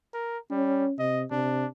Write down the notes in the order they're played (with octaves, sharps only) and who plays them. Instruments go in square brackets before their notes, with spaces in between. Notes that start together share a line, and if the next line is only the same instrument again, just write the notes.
[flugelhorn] A#4
[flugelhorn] G3 [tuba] C#4
[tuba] C3 [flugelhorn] D#5
[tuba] C3 [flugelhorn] D4